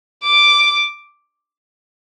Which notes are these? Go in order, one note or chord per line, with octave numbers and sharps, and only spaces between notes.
D6